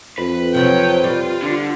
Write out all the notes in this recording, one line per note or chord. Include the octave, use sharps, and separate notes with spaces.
F2 B4
C3 F3 F#3 C#5 G5
G3 F4
D3